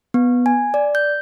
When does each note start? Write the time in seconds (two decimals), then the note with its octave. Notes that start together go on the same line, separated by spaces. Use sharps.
0.14 B3
0.46 G#5
0.74 D5
0.95 G6